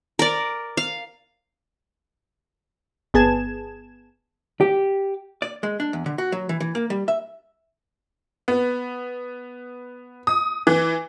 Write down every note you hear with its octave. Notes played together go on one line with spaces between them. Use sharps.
A#4 D5
F5
G1 B3 G#4 A5 G#6 E7
G4
D5
G#3
D4
E2
D3
F#4
F#3
E3
E3
A#3
G3
E5
B3
D#6
E3